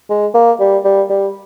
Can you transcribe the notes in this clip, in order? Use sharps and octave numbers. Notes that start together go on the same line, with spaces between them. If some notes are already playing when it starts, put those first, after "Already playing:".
G#3
A#3
G3
G3
G3